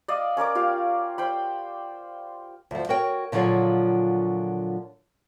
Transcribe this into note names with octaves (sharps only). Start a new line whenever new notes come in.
D5 D#5 F5
C#4 A#4 D5 D6
F4 G4 F5
C5 G5 B5
D2 F3
F#4 A#4 C#5 G5
A#2 D3 F3 F#3 F4 G#4